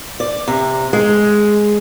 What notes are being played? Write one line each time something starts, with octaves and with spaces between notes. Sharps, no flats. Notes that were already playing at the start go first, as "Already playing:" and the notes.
D5
C3
G#3